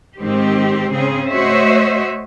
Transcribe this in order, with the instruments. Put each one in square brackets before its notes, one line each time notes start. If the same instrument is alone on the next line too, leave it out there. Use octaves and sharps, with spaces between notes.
[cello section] G#2 D#3 C4 G4
C#3 C4 G#4
A3 F#4 C5 C#5 D#5 E5